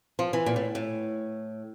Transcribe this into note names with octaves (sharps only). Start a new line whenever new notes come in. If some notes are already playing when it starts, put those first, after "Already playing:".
F3
E3
A#2
A2
A2